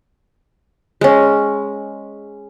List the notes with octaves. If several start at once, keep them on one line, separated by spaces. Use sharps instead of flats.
G#3 C#4